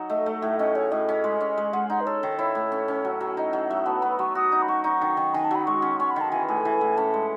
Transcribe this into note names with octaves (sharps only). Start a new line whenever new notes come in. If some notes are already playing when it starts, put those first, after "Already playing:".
Already playing: F#3 D#4
A3 D#5
A3
A2 E5
C#4 D#5
G#4 C#5
A2 D#5
C#4
G#3
C#4
G#3
G#3 F#5
D#4 F#5
B4
A4 C#5
D#3
E4 C#5
A2
C#4
C#4
F#3
F#3
D#4 D#5
F#3
F#3 E5
B3 A5
B3 B5
F#3 C#6
F#4 D#6
D#4
B5
F#4 C#6
D#4 C#6
D#3
D#3
D#3 G#5
A5
F#3 B5
G#3 C#6
C#4
C#4 C#6
B5
D#3 A5
E3 G#5
A2 G#5
E3
A2
C#4 A5
G#3